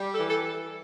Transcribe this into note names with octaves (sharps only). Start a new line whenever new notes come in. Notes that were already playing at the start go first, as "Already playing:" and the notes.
Already playing: G3
A4
E3
A4